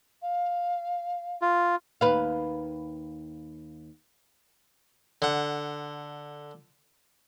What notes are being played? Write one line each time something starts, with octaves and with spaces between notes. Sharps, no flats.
F5
F4
D#2 B4 F5
D3 F#5